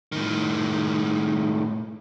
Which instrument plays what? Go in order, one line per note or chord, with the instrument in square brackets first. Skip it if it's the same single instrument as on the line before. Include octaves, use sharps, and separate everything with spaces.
[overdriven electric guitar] A2 D#3